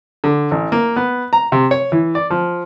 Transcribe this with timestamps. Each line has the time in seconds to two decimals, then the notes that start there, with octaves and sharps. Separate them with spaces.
0.24 D3
0.51 A1
0.72 A#3
0.96 B3
1.33 A#5
1.52 C3
1.71 C#5
1.92 E3
2.15 D5
2.30 F3